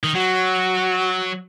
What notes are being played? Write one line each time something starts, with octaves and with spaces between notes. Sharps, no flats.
D#3
F#3 F#4